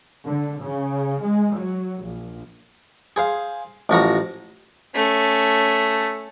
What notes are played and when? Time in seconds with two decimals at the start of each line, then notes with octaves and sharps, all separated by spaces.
0.25 D3
0.61 C#3
1.22 G#3
1.54 F#3
2.00 A#1
3.16 G#4 C5 F5
3.89 A1 F3 F#4 A#5
4.95 A3 C#4